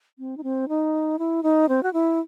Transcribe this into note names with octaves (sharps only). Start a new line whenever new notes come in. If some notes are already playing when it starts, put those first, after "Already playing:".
C4
D#4
C4
D#4
E4
D#4
C4
F#4
E4